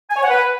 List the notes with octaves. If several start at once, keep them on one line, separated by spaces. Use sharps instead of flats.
G#5
C#5
F#5
B4